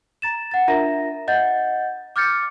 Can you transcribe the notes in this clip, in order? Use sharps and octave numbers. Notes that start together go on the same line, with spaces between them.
A#5 A6 E7
F#5 A6
D4 F4 A#4 E5 A#5 A#6
D#5 F#5 G6 A6
D6 F6 G6 A6 C#7